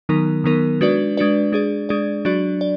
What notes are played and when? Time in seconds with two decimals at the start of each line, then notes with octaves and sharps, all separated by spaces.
0.09 D#3 F#3 B3 D#4 A#4
0.44 D#3 F#3 B3 D#4 A#4
0.81 G#3 D4 F#4 B4 D5
1.17 G#3 D4 F#4 B4 D5
1.52 G#3 D4 G#4 D5
1.89 G#3 D4 G#4 D5
2.25 F#3 D4 F#4 D5
2.61 D5